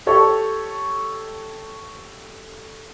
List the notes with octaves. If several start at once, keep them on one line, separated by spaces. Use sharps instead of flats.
G4 A4 C#5